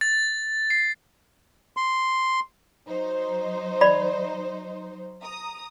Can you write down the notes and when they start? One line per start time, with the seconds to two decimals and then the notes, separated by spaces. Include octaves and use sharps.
0.01 A6
0.70 C7
1.77 C6
2.87 F#3 D#4 C5
3.81 D5 B5
5.23 A#5 D#6